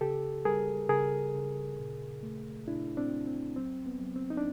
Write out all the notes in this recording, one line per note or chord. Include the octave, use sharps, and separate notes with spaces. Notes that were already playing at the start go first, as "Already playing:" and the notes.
C#3 G4 A4
G3 G#4 A#4
C#3 G#4 A#4
C#3
A#2
A3
A#2 D4 E4
C4 D4
C2
C4
F#3 C4
B3
F#3
C4
D#4
D4